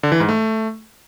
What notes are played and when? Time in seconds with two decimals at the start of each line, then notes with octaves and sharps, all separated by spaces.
0.03 D3
0.12 E3
0.20 G#2
0.29 A3